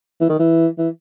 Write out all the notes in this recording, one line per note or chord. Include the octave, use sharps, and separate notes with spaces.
E3
D#3
E3
E3